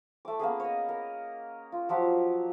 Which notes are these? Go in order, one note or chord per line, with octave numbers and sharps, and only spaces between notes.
A3 D6
A#3 B3 C#4 G#4
C#5 D#5
A#4
F4
F3 F#3 G4